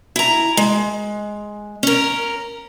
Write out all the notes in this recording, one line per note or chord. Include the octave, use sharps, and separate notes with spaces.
E4 A#5
G#3
C#4 A#4